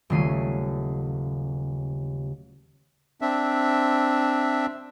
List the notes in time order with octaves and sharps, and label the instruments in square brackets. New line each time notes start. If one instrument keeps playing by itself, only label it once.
[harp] D#1 C#3 F#3 A3 C7 D#7
[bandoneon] C4 D4 E5